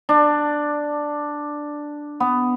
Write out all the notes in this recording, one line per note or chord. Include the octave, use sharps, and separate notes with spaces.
D4
B3